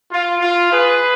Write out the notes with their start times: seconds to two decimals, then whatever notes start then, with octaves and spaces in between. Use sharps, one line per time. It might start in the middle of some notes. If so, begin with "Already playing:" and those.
0.12 F4
0.41 F4
0.70 G#4 B4